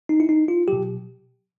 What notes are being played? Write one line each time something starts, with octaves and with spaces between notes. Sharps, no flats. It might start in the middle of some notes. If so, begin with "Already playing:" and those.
D#4
E4
D#4
F4
B2 F#3 G4